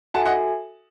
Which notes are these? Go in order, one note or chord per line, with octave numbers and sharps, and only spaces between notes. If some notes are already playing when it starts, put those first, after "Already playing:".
F#4 A4 E5 F#5 G#5 A5
D#5 F#5